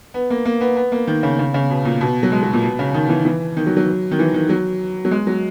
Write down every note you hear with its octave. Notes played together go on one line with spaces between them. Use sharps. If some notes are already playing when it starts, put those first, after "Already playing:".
B3
A#3
A#3
B3
B3
A#3
D#3
C#3
C#3
C#3
B2
A#2
B2
F#3
G#3
F#3
A#2
B2
C#3
D#3
E3
E3
D#3
F#3
F#3
D#3
E3
D#3
F#3
F#3
G#3
F#3